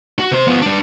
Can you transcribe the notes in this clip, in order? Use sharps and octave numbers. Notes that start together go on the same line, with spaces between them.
F#4
C3 C5
F3 B3
G3 D4